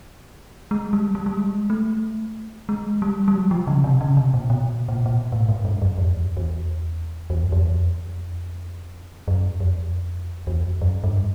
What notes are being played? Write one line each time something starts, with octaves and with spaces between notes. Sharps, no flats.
G#3
G3
G3
G3
G#3
A3
G#3
G3
G3
F#3
F3
C#3
C3
C#3
C3
A#2
B2
A#2
B2
A#2
A#2
B2
A2
G#2
G2
F#2
F2
E2
E2
E2
F#2
F2
E2
F2
F#2
F2
E2
F2
F#2
G2